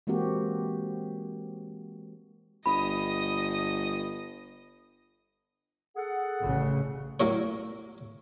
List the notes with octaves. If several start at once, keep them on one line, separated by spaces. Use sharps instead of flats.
E3 G#3 A#3 C4 F#4 G4
G1 D#5 B5 D#6
G#4 A4 F#5
A1 C#3
A2 F#3 A#4 C#5